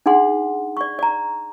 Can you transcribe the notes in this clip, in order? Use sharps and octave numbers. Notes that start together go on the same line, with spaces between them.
D4 D#4 G#4 F#5 C6
D5 C#6
D5 A#5